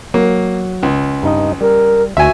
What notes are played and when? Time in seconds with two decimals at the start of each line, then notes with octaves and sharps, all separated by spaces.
0.14 F#3 A#3
0.83 C#2
1.23 G2 D#4 D#5
1.61 G3 A#4
2.17 D2 F#4 E5 G#5